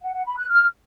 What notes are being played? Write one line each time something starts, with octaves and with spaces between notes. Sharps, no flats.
F#5
F#5
B5
F#6
F6